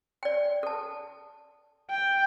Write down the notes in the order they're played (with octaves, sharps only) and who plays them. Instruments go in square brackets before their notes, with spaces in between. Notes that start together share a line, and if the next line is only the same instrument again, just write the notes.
[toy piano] D5 G5
A4 A5
[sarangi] G5